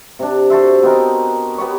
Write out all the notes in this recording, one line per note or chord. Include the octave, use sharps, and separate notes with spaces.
C3 D4
F#4 A4 C5 E5
B3 C4 D#4 A#4
B3 G4 C#5